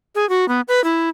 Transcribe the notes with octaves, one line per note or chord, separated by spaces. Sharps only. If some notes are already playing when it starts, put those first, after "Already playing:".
G#4
F#4
B3
B4
E4